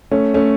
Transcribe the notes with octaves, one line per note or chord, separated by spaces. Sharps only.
A3 C#4
A3 C#4